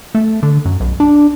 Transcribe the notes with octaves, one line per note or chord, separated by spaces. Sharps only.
A3
D3
F#2
B1
D4